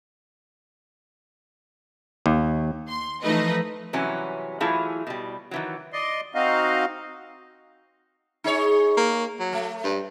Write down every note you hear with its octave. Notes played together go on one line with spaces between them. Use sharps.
D#2
C6
E3 F3 A3 D#4 B4 D#5
C3 E3 F#3 G3 C#4
E3 F#3 A3 E4 F4 G#4
B2 G3
D#3 E3 F#3
D5 D#5 C6
C4 D#4 F#4 D#5 F5
D#4 G#4 C#5
A#3
F#3
A3
G2